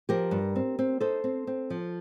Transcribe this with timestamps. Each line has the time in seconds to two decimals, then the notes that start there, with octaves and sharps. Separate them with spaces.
0.09 F3 G4 A#4
0.31 G2
0.56 C4
0.79 C4
1.00 D#4 A4 C5
1.24 C4
1.47 C4
1.70 F3